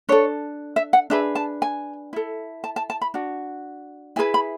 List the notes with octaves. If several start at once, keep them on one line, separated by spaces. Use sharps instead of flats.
D4 A4 C#5
E5
F#5
D4 G#4 B4 E5
A5
G#5
E4 A4
A5
A5
A5
B5
D4 F#4
E4 G#4 B4 G#5
B5